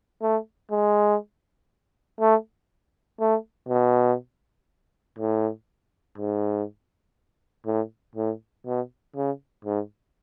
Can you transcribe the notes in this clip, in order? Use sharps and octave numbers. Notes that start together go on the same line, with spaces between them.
A3
G#3
A3
A3
B2
A2
G#2
A2
A2
B2
C#3
G#2